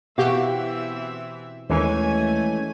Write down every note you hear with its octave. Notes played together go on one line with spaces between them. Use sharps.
B2 E3 C4 F#4 G4 E5 F5
D#2 E3 G#3 A3 C#4 G#5